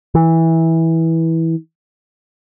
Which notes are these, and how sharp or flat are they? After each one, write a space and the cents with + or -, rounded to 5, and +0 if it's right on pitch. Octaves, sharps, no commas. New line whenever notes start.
E3 -15